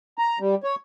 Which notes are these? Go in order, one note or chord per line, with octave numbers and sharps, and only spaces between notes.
A#5
G3
C#5